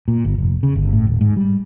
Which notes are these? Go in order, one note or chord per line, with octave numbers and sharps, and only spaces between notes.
A#2
G1
F1
C#3
G1
A2
D#1
G#2
G3